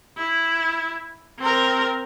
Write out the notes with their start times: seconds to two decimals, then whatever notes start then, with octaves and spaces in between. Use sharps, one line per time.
0.17 E4
1.39 C4 A#4